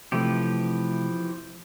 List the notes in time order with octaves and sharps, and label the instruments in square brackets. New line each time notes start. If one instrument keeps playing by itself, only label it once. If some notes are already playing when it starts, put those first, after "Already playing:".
[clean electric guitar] C3 A3 [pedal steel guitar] E3 F3 G4